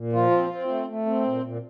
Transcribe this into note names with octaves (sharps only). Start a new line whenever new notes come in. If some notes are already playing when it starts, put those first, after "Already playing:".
Already playing: A#2
F3 F4
C4
C4
A3
A3
C4
A#2
A#2